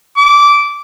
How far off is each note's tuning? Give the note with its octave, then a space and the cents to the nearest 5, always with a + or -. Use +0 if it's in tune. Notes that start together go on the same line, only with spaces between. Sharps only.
D6 -15